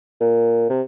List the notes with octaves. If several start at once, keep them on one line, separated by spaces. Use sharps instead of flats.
A#2
C3